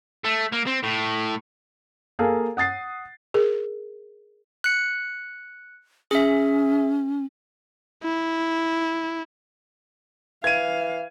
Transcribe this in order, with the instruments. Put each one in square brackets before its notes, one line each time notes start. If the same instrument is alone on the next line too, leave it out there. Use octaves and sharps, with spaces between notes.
[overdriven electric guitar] A3
A#3
C4
A2
[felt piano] A#3 G#4 A4 F5
F#5 D#6 A6 C7
[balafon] G#4 A#4
[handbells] F#6 C#7
[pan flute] C#4 [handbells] G#4 E5
[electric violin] E4
[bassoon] E3 [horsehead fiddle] F5 [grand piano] G#6 D#7